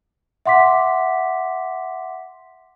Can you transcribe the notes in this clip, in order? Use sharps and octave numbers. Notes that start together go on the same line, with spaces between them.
E5 F#5 C6 D6 B6